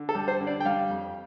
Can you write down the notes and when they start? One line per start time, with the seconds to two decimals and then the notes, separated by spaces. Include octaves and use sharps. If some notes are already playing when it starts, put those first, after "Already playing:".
Already playing: D3
0.09 A4
0.15 G3
0.28 C5
0.40 D3
0.47 D5
0.60 G5
0.65 G3 F5
0.90 F2